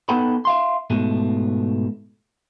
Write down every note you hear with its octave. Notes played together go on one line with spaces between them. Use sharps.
B3 D#4 A4 F#5 G5 B5
E5 F5 C6
G#2 B2 A3